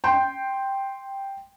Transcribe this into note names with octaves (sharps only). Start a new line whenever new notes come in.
G5 C6